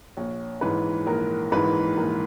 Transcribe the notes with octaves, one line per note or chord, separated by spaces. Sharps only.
A#1 C#5
G#2 E3 B4
A#1 A#4
G#2 E3 B4
A#1 A#4